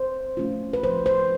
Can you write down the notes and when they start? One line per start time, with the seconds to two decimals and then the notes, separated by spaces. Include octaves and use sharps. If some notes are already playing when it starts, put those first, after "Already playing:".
Already playing: C5
0.37 A3 C#4 F4
0.73 B4
0.84 F3 C5
1.06 C5